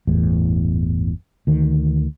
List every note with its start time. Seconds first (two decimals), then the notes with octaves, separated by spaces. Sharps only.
0.07 G1 E2 A2
1.47 D2 D#3